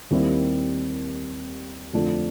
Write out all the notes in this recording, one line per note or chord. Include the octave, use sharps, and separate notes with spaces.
D#2 D#3 G3 C4 E4
F2 D3 F3 A3 D4